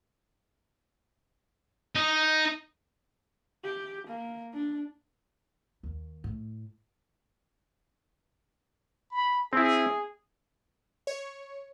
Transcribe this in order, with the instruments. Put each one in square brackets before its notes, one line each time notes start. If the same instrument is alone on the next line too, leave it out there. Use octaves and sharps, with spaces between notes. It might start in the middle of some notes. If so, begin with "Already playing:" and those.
[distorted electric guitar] D#4
[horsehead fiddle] G4
A#3
D4
[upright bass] D#2
A2
[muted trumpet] B5
[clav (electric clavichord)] C4 E4 [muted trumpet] G#4
[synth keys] C#5